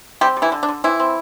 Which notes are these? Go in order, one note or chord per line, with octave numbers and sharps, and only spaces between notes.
G3 C4 G4
G3
E3 E4
D3
D4
D3
E3 C4 E4
C4